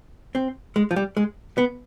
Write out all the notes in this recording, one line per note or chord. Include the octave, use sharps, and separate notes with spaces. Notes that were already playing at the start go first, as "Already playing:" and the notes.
C4
G#3
F3
G3
G#3
B3